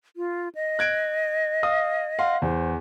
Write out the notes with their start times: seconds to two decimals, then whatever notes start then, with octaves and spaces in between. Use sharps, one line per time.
0.17 F4
0.55 D#5
0.79 F#6 G#6 D7
1.63 F5 D#6
2.19 F5 F#5 C6
2.42 E2 C5